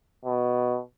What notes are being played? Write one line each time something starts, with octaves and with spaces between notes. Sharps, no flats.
B2